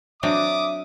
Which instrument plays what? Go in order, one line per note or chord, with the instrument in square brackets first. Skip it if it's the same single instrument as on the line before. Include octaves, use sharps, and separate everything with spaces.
[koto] F#3 C4 D4 [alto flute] E5 [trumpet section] D6 D#6